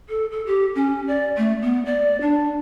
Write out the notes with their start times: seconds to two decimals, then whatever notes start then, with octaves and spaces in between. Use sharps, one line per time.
0.09 A4
0.31 A4
0.47 G4
0.75 C#4
1.07 D5
1.37 A3
1.62 B3
1.86 D5
2.21 D4